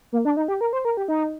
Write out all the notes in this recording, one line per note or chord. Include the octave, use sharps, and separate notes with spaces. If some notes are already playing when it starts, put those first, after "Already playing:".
A#3
D4
D#4
G4
A#4
C5
A#4
G4
D#4